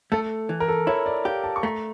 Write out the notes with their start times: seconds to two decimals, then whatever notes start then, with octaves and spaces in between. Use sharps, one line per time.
0.12 A3 A4
0.49 E3
0.60 A#4
0.68 A4
0.87 E4 C#5
1.06 D5
1.25 G4 F5
1.44 A5
1.56 C#6
1.63 A3 A#5